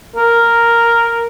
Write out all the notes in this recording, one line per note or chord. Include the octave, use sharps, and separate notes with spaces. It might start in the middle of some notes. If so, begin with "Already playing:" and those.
A#4